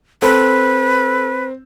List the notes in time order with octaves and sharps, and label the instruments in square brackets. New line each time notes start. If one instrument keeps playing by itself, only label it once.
[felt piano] C4 [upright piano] A4 [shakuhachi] B4